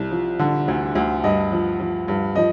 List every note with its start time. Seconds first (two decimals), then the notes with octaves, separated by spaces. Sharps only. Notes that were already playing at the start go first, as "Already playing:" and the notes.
Already playing: C2
0.11 F3
0.39 D3
0.68 D2
0.95 D2
1.24 G2 D#5
1.52 F3
1.80 F3
2.08 G2
2.36 F3 D#5